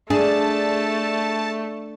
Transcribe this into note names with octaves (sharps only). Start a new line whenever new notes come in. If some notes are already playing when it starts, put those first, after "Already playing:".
A3 D4 G#4 A5